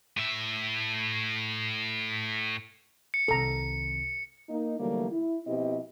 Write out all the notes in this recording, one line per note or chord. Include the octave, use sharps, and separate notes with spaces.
A2 E5
C#7
C2 D#3 A4 A#5
A#3 D#4
D3 E3 F#3 G3 A3 A#3
E4
B2 F3 C4 E4 G4 D#5